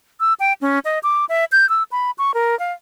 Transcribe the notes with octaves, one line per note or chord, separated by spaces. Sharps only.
E6
G5
C#4
D#5
D6
E5
G6
E6
B5
C#6
A#4
F5